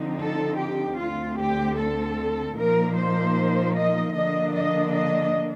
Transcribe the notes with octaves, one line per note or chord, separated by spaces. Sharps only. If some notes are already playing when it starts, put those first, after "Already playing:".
Already playing: D3 F3 C4 D#4
A4
G4
D2 D3 A3 C4 F4
G4
A4
A#2 F3 A#3 D#4 A#4
C5
D#5
D3 F3 A#3 D4 D#5
D#5
D#5